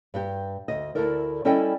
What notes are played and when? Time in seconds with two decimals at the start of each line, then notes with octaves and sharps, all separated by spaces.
0.14 G2 G4
0.68 D2 D#5
0.95 D2 E4 A4 A#4 D5
1.45 G3 C#4 E4 A4 D#5 G5